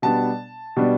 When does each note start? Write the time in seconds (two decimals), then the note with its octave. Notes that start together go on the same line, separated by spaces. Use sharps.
0.02 B2 G3 B3 D4 A5
0.76 B2 G3 B3 D4